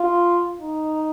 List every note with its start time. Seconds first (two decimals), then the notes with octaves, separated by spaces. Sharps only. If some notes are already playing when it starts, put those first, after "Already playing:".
Already playing: F4
0.61 D#4